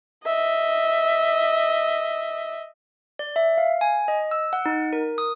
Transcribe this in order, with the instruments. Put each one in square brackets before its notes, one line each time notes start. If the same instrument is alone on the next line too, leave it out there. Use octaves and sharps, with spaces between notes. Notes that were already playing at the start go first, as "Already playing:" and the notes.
[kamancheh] D#5 E5
[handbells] D5
E5
F5
G#5
D#5
E6
F#5
D#4
A#4
D#6